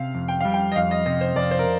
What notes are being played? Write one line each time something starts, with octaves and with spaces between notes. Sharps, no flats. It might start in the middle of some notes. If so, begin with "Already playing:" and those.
Already playing: C3 F5
F2
G5
G3 F5
G5
D#5
F2 F5
D#5
C3 D#5
C5
F2 D5
C5
A#4